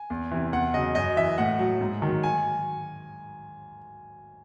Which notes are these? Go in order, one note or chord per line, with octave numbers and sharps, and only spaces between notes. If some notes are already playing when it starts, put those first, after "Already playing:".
Already playing: G#5
E2
C3 E3
E2 F#5
C#3 F#3 D#5
F#2 D#5
E3 E5
A2 F#5
F#3
G#2
D#3 F#3
G#5